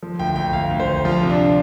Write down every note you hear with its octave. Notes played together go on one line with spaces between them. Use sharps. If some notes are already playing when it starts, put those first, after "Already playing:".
F3
D2 G5
D2 G5
D2 F5
D2
C5
D2
F3 F4
C3
D4